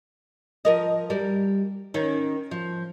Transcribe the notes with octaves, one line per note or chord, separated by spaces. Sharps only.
F3 A#4 D#5
G3 A#4
D#3 C#4
F3